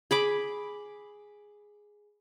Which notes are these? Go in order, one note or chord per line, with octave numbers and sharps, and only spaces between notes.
G#4 B5 D6